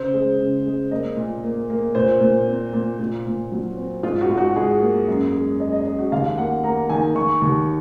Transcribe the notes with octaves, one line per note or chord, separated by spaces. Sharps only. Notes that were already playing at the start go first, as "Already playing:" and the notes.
Already playing: C#3 C5
G#3
C#3
G#3
A#3 D#5
A#2
A#3
A#3
A#2 C5
A#2
C4
A#2
A#2 F4
A#2
F#3
C4
G#2 F4
F#4
G#2
F#4
G#2 G#4
A#3
F#2
G#3
G#3 D#5
D#5
G#3 D#5
F#4
D#2 F5
A#3 F#5
A#3 A#5
D#3 G#5
D#3 C#6
D#2